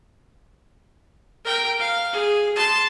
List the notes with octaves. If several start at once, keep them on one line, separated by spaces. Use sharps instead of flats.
A#4 G5
F5
G#4
A5 C6